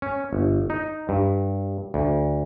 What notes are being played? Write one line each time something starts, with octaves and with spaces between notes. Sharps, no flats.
C#4
G1
D#4
G2
D2